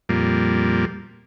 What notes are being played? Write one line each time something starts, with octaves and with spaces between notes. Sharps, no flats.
F2 A#2 G3 A#3